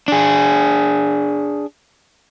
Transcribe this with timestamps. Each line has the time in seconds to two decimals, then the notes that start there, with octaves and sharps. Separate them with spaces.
0.08 D4 G#4